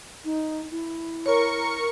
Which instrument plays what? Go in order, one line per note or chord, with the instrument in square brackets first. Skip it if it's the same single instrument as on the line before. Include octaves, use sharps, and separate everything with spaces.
[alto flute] D#4
E4
[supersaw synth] A#4 C#6 C#7 [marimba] C#5